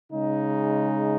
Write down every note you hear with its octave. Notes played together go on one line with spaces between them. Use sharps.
C#3 G#3 D#4